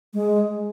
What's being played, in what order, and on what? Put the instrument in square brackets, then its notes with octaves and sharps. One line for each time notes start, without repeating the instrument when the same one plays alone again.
[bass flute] G#3